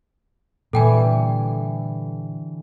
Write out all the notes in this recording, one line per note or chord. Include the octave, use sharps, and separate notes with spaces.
A#2 D3 E3 G3 A4 G5 G#5